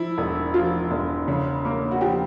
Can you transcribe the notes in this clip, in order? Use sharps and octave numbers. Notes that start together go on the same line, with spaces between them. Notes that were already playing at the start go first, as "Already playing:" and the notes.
Already playing: F3 E4
E1
F3 F4
E1
C#3
A#3
F#4
F3 G4